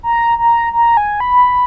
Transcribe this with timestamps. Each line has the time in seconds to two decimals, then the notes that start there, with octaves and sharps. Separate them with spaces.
0.03 A#5
0.38 A#5
0.73 A#5
0.97 G#5
1.20 B5